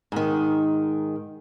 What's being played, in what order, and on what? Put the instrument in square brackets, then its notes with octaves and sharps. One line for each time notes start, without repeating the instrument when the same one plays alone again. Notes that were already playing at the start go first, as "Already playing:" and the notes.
[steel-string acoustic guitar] G#2 D#3